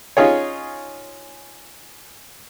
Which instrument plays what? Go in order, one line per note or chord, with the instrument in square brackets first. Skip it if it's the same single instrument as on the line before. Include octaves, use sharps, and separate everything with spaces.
[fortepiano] C#4 D#4 F4 G#4 C#5